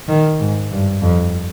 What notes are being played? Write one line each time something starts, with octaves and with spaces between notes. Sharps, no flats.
D#3
G#2
G2
F2